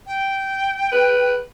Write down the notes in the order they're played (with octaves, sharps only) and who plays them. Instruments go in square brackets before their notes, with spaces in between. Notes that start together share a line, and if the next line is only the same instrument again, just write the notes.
[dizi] G5
[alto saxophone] B4